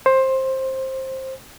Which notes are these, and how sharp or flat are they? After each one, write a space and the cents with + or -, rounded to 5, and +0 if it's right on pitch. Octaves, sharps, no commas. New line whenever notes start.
C5 +15